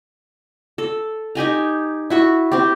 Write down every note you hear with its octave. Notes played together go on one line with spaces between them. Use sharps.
A4
D#4 G4 G#5 A#5
E4 F#4 C#6
C4 G4